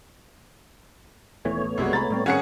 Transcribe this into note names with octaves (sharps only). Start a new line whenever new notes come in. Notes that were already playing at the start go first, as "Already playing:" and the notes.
D#1 A#2 E3 A3 B3 C#5
A1
B1 F#2 C3 G3 G#3 F#4
C2 G#3 A#5 B5 A6
A2 G3 C4
G#1 C#4 G#4 F#5 C#6 C#7